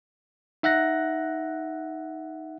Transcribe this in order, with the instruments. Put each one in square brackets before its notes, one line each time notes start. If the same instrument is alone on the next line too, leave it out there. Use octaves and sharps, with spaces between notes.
[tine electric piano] D#4 E5 F#5 F#6 A#6